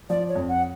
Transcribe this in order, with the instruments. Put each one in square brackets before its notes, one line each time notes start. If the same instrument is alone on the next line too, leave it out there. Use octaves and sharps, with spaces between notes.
[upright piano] F3 [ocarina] D5
[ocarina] C#5
[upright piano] F2
[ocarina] F#5